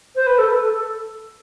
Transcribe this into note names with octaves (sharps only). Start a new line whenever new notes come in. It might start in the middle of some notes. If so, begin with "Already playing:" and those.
C5
B4
A4
B4
A4
A4